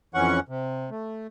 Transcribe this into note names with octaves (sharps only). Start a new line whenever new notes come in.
F2 E3 C#4 F#5 C#6
C3
A3